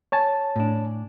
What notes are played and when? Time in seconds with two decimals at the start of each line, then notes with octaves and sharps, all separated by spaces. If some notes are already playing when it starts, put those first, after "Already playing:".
0.12 C#5 G#5 A5
0.56 A2 D4